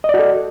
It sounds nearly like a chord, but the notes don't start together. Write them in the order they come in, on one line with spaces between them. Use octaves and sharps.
D#5 D5 F#4 A4